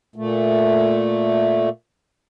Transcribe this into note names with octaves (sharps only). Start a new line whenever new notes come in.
A#2 A3